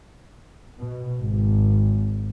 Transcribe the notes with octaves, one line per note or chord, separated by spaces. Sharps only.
B2
G#1